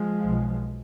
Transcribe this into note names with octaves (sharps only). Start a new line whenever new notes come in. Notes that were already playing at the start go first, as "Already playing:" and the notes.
Already playing: F3 G#3
B1 B2